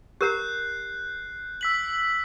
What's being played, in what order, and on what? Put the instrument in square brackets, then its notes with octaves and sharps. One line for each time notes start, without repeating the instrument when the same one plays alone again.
[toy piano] G4 A#4 A#5 [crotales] F#6 G6 C7
[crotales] E6 B6 F#7